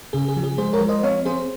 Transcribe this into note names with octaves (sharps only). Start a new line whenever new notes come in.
C#3 G#4
G#4
F3
G#4
G#3 G#4 C5
A#4 C#5
F3
C5 D#5
C4 C#5 F5
C4 G#4 C5